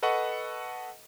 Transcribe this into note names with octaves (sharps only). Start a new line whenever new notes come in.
A4 B4 D#5 F#5 C#6